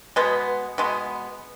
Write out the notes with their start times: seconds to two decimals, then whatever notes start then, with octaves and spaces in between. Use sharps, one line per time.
0.16 B2 G#3 B3
0.78 B2 G#3 B3